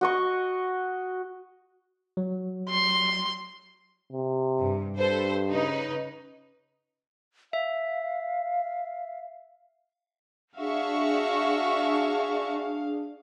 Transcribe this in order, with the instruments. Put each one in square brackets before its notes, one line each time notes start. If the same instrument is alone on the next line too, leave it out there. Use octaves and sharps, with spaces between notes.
[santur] F#4 D#5 C#6
[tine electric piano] F#3
[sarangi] C6
[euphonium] C3
[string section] G2
[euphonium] G2 [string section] A4 B4 C5
[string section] C#3 D#4 B4
[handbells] E5 [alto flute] F5
[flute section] D4 G#4 [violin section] F#4 E5 C#6 [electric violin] F5